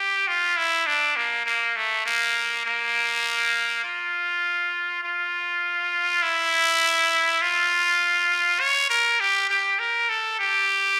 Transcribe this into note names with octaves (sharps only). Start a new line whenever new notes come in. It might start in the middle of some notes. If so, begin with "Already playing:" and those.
Already playing: G4
F4
E4
D4
A#3
A#3
A3
A#3
A#3
F4
F4
E4
F4
C#5
A#4
G4
G4
A#4
A4
G4